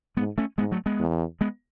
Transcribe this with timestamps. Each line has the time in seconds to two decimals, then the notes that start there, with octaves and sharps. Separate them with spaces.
0.17 G#2 G#3 B3
0.38 A3 C#4
0.58 G#2 G#3 B3
0.72 F#3 A3
0.86 G#3 B3
1.00 E2
1.41 G#3 B3